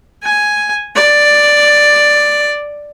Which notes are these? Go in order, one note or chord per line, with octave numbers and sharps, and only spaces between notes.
G#5
D5